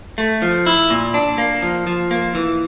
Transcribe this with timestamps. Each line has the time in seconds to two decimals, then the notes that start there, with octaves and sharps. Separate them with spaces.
0.18 A3
0.42 F3
0.66 E4
0.90 A#2
1.14 D4
1.38 A#3
1.62 F3
1.87 F3
2.11 A#3
2.35 E3